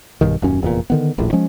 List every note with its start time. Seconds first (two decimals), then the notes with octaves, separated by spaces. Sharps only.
0.21 B1 G2 D#3
0.42 D#1 F#2 C#4
0.62 F1 E2 G2 A#2
0.90 D3 D#3 B3
1.18 D#1 A#1 A2
1.33 F3 G#3 C#4